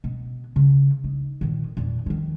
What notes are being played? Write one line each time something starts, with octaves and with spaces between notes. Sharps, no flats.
B2
C#3 D#4
D#4
A#2 D#3
E2 A#2
D#3 F3